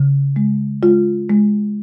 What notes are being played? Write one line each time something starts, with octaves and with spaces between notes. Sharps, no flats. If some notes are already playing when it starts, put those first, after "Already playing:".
Already playing: C#3
G#3
G#3 F4
G#3